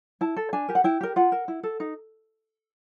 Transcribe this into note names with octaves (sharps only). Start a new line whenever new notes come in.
E4 A5
A4
D4 G#5
G4 A#4
F#5
E4 G5
G4 A#4
F4 F#5
A#4
E4
A4
D#4